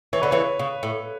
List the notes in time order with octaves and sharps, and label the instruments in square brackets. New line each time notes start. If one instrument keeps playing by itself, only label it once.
[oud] E3 [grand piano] C#5
[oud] D3 [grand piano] B4
[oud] C#3 E3 [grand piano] C#5
[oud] C#3
A2